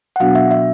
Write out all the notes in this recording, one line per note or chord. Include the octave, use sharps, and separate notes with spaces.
F#5
B2 F#3 B3 D4 F#4 F5
E5
E5